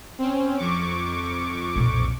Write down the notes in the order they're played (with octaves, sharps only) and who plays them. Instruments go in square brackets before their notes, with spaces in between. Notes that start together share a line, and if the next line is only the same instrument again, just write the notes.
[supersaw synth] C4 C#4
F2 C#6 D6
[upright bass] B1 A#2